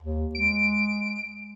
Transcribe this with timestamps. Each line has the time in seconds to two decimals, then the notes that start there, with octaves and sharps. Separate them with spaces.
0.02 D#2
0.35 G#3 D7